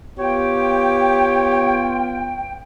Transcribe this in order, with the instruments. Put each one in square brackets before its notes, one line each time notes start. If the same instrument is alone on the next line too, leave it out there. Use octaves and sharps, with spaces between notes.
[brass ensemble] B3 F4 [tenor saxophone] G4 [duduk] C#5 [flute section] G5